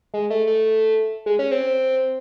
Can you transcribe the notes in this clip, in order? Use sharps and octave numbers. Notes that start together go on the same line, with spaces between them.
G#3
A3
A3
G#3
C#4
C4